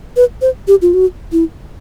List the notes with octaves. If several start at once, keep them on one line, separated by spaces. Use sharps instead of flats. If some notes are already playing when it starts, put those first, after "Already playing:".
B4
C5
G4
F4
F#4
E4